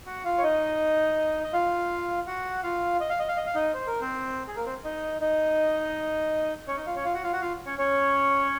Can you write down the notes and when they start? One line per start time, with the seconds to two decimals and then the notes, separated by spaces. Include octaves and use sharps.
0.06 F#4 F#5
0.25 F4 F5
0.38 C#5
0.43 D#4 D#5
1.44 D#5
1.53 F4 F5
2.27 F#4 F#5
2.63 F4 F5
3.00 D#5
3.10 F5
3.19 D#5
3.28 F5
3.37 D#5
3.46 F5
3.55 D#4 D#5
3.74 C5
3.87 A#4
4.01 C4 C5
4.48 G#4
4.56 A#3 A#4
4.66 C4 C5
4.84 D#4 D#5
5.21 D#4 D#5
6.68 C#4 C#5
6.77 D#4 D#5
6.86 F4 F5
6.96 C#4 C#5
7.05 F4 F5
7.14 F#4 F#5
7.23 F4 F5
7.32 F#4 F#5
7.42 F4 F5
7.66 C#4 C#5
7.78 C#4 C#5